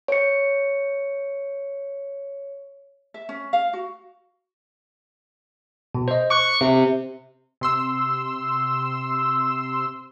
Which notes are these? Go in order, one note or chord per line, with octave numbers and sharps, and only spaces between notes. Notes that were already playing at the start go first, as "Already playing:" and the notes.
C#5 C#7
E5
C#4
F5
F#4
B2
C5 D#5
C#6 D6 F#6
C3
C3 C6 E6